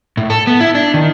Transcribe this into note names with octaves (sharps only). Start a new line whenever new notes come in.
A2
A4
B3
E4
D4
D#3